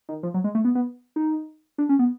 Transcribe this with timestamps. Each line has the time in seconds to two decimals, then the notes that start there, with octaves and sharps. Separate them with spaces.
0.09 D#3
0.23 F3
0.34 F#3
0.44 G#3
0.55 A3
0.65 B3
0.75 B3
1.16 D#4
1.78 D4
1.89 C#4
1.99 B3